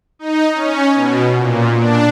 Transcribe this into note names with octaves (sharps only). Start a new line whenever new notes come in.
D#4
C#4
B2
A#2
D4